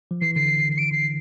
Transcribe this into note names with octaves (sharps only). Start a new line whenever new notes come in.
F3
E3 C7
D3 C7
C7
D7
C7